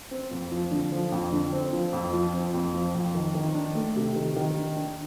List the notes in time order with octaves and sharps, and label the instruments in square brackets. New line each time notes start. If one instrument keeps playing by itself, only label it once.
[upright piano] C4
F2
F3
D3
F3
F2
D3
C4
F3
F2
F3
C4
F2
F3
F2
D#3
D#3
D4
A3
C3
D#3
D#3
D4
D4